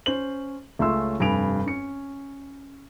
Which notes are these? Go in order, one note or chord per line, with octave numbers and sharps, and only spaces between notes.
C#4 C5 F#7
C#2 A3 C#4 E5 C6 E6
F1 G2 G#5 B5 D7 F7
C#4 C#7